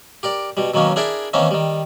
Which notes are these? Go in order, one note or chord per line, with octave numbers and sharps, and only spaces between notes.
G4 A#4 D5
B2 G3
B2 D#3 F#3 A#3 C#4
D4 E4 G#4 A#4 D5 E5
D#3 E3 A#3 C4 C#4 D#4
D#3 G3